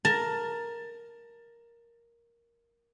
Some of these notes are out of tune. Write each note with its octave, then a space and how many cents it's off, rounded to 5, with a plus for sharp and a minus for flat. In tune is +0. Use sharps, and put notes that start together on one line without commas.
A#4 +5 A5 +15